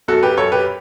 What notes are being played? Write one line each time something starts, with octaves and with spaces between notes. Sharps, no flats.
F#2 F#4 A4
G4 B4
F#2 A4 C#5
G4 B4